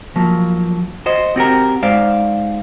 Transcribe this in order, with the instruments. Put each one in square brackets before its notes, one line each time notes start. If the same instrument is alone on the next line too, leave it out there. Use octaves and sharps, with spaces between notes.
[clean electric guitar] F3 F#3 A#3
F#4 C5 D#5
C4 F#4 G4 A#4
G#2 C5 D5 F5